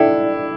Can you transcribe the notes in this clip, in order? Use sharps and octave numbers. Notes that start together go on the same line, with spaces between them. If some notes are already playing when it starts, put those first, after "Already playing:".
Already playing: D4 E4 A4 G5